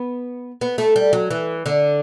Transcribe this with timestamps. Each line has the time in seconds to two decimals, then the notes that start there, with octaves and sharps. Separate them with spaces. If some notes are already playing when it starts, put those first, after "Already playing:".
Already playing: B3
0.61 B3
0.78 A3
0.96 G3
1.13 F#3
1.31 E3
1.66 D3